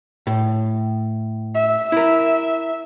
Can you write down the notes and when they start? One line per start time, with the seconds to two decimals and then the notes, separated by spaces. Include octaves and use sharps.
0.27 A2
1.55 E5
1.92 E4 A#4